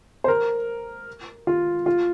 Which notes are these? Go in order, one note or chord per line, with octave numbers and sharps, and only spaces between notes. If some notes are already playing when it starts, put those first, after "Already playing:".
C5
A#4
F4
F4